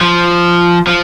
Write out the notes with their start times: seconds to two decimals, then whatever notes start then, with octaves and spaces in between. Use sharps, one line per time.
0.01 F3
0.87 F3